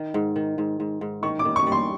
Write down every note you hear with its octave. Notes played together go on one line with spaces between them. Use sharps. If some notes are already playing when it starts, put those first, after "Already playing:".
Already playing: D#3
G#2
D#3
G#2
G#2
G#2
D#3 C#6
D6
D#3
C#6
G3
C6